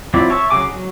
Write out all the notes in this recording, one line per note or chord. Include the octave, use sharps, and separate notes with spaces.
F3 F#3 C4 E4 D5
C#5 E5 A5
C#3 F#3 G#4 G#5 D6
F#3